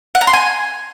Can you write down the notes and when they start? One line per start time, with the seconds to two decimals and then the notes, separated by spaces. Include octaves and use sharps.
0.15 F#5
0.21 A#5
0.27 C6
0.33 G#5